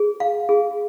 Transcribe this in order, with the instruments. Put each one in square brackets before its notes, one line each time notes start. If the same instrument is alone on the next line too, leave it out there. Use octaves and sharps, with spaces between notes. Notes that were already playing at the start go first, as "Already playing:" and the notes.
Already playing: [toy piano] G#4
F5
G#4